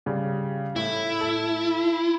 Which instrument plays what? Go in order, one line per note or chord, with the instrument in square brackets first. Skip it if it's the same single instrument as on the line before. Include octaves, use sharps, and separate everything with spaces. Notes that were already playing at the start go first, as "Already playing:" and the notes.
[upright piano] C#3 G3
[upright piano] A2 [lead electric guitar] E4
[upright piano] A4